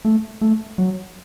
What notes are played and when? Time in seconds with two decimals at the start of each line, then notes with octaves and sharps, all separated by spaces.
0.05 A3
0.41 A3
0.78 F#3